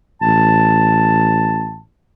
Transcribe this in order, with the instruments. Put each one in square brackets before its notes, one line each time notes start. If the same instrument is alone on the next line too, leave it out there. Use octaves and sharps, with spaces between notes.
[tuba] A1 [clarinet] A5